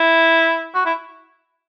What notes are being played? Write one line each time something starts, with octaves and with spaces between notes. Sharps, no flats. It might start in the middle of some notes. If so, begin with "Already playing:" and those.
Already playing: E4
F#4
E4